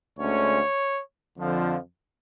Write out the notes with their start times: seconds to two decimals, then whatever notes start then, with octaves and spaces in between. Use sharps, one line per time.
0.19 D2 D3 G#3 C#4 C#5
1.37 F2 D3 F3